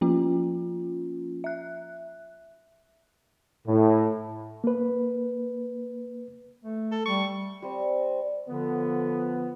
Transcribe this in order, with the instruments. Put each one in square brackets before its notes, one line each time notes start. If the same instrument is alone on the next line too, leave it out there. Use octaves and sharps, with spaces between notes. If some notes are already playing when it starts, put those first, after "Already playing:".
[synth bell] F3 A#3 C#4 F4
E5 F#6
[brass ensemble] A2
[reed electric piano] A#3 B4
[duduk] A3
[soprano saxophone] A4
[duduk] G3 [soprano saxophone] C#6
[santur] G3 C4
[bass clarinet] D3 [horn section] F3 B3